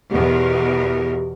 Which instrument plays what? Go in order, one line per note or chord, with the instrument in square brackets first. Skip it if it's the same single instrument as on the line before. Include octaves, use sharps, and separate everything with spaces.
[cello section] E2 B2 A#4 [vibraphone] G4